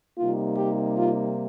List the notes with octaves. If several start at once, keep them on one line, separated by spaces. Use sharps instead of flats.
C3 G3 A#3 D#4 F4
G4
F4